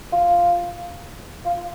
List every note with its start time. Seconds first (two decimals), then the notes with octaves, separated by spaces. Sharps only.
0.13 F4
1.46 F4